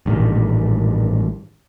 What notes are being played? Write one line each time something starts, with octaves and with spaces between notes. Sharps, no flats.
A1 G2 A#2 D#3